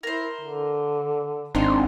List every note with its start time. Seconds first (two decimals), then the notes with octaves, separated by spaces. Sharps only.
0.03 E4 A#4 C5
0.41 D3
1.55 G#1 C4 D4 D#4 F4 C5 C6